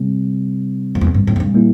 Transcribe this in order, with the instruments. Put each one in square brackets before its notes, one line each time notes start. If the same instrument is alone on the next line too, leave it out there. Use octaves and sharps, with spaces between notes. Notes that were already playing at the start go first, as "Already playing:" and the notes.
Already playing: [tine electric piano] C3 G3 C4
[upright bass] F2
E2
G2
A2
F2
G2
[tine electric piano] A#2 G3 A#3 E4